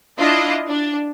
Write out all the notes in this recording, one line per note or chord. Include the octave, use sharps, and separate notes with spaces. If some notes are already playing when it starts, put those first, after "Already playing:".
D4 E4 F4 D#5
D4